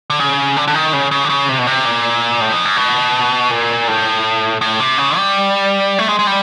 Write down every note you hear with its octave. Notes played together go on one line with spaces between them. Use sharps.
D3
C#3
D3
D3
D#3
C#3
C#3
D3
C#3
C3
B2
C3
A#2
A2
F2
F#2
B2
A#2
A2
A2
C3
C#3
G3
A3
G#3
G#3
G3